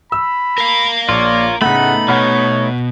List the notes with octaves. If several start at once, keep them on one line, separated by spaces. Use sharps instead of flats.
B5 E6
A#4 F5
A#1 F4 C#5 D5
A2 C#3 A3 B3 D#4 F#5 B5
B2 C#5 F#5 B5 F6